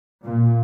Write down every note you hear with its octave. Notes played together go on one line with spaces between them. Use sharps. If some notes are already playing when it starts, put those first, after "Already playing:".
A#2